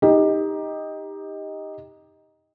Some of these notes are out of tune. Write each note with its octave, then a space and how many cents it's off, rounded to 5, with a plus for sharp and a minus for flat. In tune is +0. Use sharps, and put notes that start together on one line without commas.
D#4 +10 G4 +20